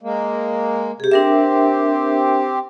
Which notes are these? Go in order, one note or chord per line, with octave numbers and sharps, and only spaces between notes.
G#3 A#3
C3 G4 G#4
C4 D4 G4 A#4 E5